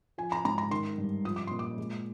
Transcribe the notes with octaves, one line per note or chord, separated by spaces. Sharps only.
F3 G#5
A#5
G#2 A#5
A#5
D#3 C6
G2
F3 D#6
D6
A#2 C6
D6
G#3